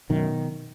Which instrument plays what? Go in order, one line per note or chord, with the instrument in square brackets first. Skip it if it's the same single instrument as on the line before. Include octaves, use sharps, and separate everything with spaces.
[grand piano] F#2 [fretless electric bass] B2 D#3